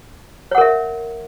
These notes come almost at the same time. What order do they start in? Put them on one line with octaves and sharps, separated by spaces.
C#5 F#5 A#4 E5